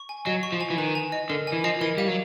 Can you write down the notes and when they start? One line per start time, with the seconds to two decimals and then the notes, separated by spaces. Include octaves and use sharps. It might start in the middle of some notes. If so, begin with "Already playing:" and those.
Already playing: C#6
0.09 G#5
0.26 F#3 D#5
0.43 C#6
0.52 F3
0.61 G#5
0.70 E3
0.77 D#3 B4
0.95 G#5
1.12 D#5
1.30 D3 A#4
1.47 G#5
1.52 E3
1.64 F3 D#5
1.81 E3 A#4
1.97 G3 F5
2.08 F#3